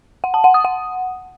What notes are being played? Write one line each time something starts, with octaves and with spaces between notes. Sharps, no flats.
F#5
A5
F#5
D#6
F#5